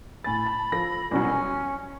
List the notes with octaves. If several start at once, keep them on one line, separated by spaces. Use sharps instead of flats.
A2 G#5 B5 A6
A5
F3 A4 A#6
C2 B2 F#3 C#4
G#5